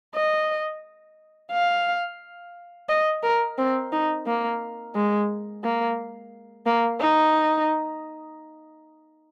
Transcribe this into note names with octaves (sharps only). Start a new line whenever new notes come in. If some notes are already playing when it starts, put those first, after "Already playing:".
D#5
F5
D#5
A#4
C4
D#4
A#3
G#3
A#3
A#3
D#4